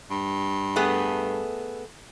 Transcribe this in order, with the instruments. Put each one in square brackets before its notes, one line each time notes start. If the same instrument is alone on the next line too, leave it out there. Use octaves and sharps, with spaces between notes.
[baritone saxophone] G2
[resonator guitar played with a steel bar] A3 B3 G#4